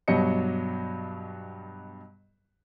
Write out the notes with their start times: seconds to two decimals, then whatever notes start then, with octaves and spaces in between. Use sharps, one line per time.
0.08 G2 B2 F#3 G4 D#5 C#7